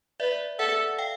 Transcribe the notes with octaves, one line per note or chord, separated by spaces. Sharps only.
B4 D5 E5
A4 E5 F#5
F5 G5